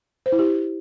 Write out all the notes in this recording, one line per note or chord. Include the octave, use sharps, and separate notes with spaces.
C5
E4
G4